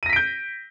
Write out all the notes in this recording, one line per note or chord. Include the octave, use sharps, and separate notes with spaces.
G6 A#6 B6 D7 D#7